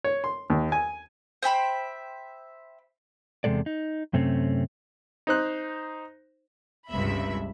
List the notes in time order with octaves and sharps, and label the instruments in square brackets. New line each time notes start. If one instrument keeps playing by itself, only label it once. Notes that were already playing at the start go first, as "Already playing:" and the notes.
[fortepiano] C#5
C6
D#2
G#5
[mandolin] C5 E5 G5 B5
[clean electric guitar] E2 C3 D#3 G#3 A4 D5
D#4
F#2 C3 A3 C4 C#4
[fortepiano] D#4 C5 F#6
[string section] G1 C#2 G2 C3 E5 B5